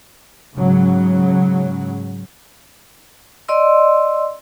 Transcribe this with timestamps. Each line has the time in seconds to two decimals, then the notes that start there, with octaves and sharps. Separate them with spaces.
0.54 G#2 C#3 F#3
3.48 D5 D#5 C6 E6